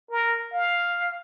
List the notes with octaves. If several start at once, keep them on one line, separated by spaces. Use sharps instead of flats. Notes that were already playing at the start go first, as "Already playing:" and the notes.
A#4
F5